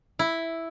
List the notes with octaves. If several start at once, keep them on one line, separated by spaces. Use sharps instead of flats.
E4